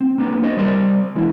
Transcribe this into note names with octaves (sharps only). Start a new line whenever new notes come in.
C4
A#3 B3 D4
F#4 C5 D#5
G3 A#4 C5 D5 C6
E3 G#3 E4